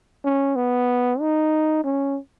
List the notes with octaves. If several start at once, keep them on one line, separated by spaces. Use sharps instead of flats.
C#4
B3
D#4
C#4